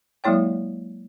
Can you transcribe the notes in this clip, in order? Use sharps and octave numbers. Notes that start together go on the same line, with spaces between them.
F#3 G#3 A#3 E4 C#5 G5